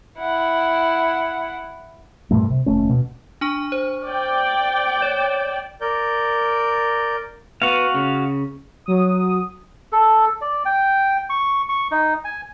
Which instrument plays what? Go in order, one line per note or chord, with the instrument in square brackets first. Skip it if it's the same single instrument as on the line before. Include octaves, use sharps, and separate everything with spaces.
[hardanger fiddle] E4 F#5
[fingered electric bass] G2 A#2 G3 A3
C3
F1 D#2 A3 C#4
B2
[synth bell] D4 G#5 C#6
C5
[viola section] D5 G5
[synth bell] C#5
[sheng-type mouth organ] A#4 D5 G6
[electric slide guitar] B3 [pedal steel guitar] F#4 F5
[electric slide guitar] C#3
[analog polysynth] F#3 D#6
[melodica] A4
D5
G5
C#6
C#6
D#4
G#5